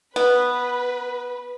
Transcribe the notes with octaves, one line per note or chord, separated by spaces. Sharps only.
B3 B4